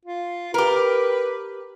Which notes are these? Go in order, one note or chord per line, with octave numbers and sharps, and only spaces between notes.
F4
G4 A#4 B4